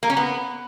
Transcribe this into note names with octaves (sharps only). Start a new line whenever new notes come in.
A#3
C#4
B3